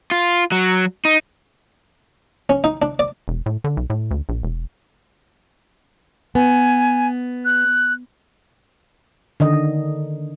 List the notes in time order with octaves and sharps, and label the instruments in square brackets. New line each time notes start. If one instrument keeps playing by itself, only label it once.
[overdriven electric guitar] F4
F#3
D#4
[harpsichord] C#4
D#4
D4
D5
[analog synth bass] E1
A2
D3
B1
A2
D2
A#1
E1
[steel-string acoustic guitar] B3 [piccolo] G#5
[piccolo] F#6
[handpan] D3 D#3 D#5